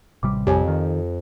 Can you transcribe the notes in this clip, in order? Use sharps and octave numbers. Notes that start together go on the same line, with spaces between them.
A1 C3 G3 D6
F2 G4 C#5 G#5
D#3